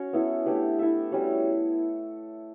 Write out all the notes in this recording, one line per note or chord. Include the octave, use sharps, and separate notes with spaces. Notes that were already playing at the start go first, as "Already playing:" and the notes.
Already playing: C#4 F#4 C#5
B3 E4 A4
A3 D4 G4 B4
E4 A4 E5
G3 C#4 F#4 C#5